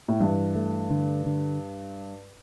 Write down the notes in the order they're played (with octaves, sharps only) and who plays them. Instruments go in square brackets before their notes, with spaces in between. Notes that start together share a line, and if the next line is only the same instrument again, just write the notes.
[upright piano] A2
[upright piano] G2 [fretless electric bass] E3
[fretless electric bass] A3
D3
D3